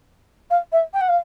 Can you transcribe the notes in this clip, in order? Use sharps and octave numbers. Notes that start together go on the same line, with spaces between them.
F5
E5
G5
F#5
F5